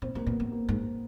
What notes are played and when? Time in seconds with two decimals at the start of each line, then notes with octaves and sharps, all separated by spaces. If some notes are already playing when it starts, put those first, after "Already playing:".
0.02 A#2 C4
0.15 A2 A#3
0.27 A#2 B3
0.40 A2
0.52 A#3
0.69 G#2